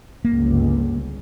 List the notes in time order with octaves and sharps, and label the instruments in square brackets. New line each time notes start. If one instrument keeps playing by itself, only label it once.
[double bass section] G1 C#2 [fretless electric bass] A#3